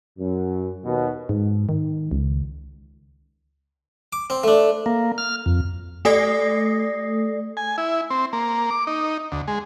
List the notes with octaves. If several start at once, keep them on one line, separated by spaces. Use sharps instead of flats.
F#2
D#2 B2
G#2
D#3
C#2
D6
C4
A3 D4
A#3
F6
F2
A3 A4 D5 D#6 A#6 C7
G#5
E4
C4
A#3
D6
D#4
D2
G#3